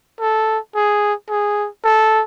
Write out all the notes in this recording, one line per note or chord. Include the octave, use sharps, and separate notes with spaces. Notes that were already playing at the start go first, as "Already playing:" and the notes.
A4
G#4
G#4
A4